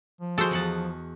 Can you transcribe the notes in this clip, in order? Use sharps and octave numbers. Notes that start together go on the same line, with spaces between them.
F3
G#3 F#4 A4 C5
E2 F#5 A5